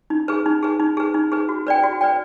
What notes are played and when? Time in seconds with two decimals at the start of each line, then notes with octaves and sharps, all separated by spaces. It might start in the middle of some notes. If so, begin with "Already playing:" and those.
0.10 D#4
0.28 G#4 B4
0.46 D#4
0.63 G#4 B4
0.80 D#4
0.97 G#4 B4
1.14 D#4
1.32 G#4 B4
1.49 F#4
1.67 B4 D5 G5
1.84 F#4
2.01 B4 D5 G5